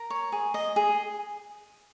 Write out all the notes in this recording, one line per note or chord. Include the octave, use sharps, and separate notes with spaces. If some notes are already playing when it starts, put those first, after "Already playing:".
Already playing: A#4 A#5
C#5
G#4
D#5
G#4